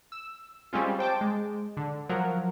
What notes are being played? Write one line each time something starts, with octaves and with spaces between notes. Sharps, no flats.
E6
G3 G#3 C4 C#4 F4
C5 G5 A5 D6
G#3
D3
F3 F#3 A#4